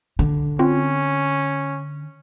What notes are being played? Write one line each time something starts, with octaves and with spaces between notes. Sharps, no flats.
D3
C4 C#4 F4